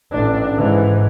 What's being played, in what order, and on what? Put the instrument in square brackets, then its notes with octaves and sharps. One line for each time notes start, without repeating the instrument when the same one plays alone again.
[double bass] A1 D4
G#2 E3